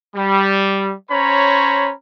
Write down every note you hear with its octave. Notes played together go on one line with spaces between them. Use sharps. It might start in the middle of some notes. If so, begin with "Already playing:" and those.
G3
C#4 C5 C#5 A#5 B5